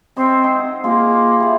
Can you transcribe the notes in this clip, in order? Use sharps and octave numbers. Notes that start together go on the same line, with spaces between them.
C4 C5 C#5 D#5
D#4
F#5
A#3 F4 G#4
E4 G4 D5